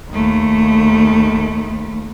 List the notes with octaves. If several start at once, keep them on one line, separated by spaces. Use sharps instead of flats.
D#2 A3